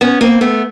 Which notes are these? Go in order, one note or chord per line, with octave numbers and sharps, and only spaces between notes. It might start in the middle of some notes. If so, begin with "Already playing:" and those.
B3 C#4
A#3 C4
A3 B3